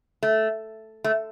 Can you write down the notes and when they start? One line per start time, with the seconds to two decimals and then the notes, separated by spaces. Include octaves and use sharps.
0.23 A3
1.04 A3